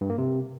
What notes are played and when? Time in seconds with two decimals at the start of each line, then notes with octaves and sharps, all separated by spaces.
0.01 G2
0.10 A#3
0.18 C3